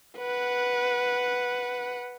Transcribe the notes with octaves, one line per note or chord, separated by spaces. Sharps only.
B4 F#5